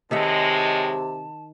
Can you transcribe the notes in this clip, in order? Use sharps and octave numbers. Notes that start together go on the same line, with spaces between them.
A2 C3 D#3 G#3 E5 F#5 A5